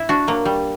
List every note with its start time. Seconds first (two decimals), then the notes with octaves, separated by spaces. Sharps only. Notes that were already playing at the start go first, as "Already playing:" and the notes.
Already playing: E4
0.09 D4 F#4
0.28 F#3 A#3
0.45 G3